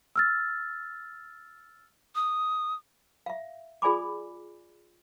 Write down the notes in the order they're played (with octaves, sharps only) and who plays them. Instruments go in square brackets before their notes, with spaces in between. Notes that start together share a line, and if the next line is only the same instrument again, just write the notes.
[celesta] E6 F6 A6
[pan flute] D#6
[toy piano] E5 F5
F4 G#4 D5 G#5 B5 D6